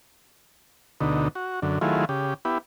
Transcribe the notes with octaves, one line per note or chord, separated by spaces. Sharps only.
D2 B2 D3 D#4
F#4
F#2 D3
D#3 F#3 A3 E4 F4 G#4
C#3 G4
B3 E4 G4